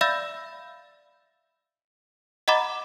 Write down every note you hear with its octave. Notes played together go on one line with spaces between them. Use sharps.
D5 E5 F5 B5 E6 G6
D#5 F#5 A#5 B5 D6 A6